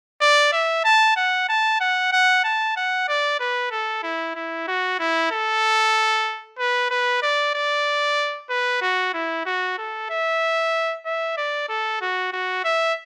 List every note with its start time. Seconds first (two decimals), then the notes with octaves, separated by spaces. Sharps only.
0.21 D5
0.53 E5
0.84 A5
1.16 F#5
1.49 A5
1.81 F#5
2.12 F#5
2.44 A5
2.77 F#5
3.08 D5
3.40 B4
3.71 A4
4.03 E4
4.35 E4
4.68 F#4
5.00 E4
5.31 A4
6.59 B4
6.90 B4
7.22 D5
7.55 D5
8.50 B4
8.82 F#4
9.14 E4
9.45 F#4
9.78 A4
10.10 E5
11.06 E5
11.37 D5
11.68 A4
12.01 F#4
12.33 F#4
12.64 E5